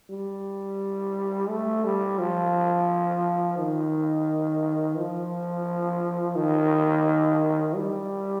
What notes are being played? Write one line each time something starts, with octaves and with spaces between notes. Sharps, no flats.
G3
A3
G3
F3
D#3
F3
D#3
G3